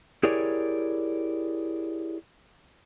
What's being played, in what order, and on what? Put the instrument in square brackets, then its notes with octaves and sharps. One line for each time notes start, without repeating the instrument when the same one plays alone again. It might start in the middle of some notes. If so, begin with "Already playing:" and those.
[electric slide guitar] E4 G4 G#4 A#4 C#5 D5